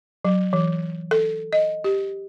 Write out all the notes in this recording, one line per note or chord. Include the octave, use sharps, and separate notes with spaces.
F#3
E3
A4
D#5
G4